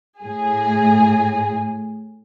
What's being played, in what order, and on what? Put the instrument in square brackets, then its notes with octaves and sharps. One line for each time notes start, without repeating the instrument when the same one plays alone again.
[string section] A2 G#4